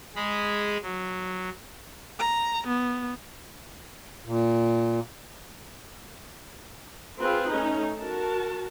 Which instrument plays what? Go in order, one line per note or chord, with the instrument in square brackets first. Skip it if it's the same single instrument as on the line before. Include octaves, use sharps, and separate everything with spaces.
[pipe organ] G#3 G#4 B5
F#3
[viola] A#5
B3
[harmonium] A#2
[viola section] C4 F4 G#4 B4
A3 C#4 D#4
F#4 A#4 A5